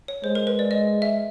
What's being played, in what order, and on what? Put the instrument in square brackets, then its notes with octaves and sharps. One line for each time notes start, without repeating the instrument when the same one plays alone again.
[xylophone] C#5
[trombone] G#3 [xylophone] C5
[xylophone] A#4
B4
D5
D#5
E5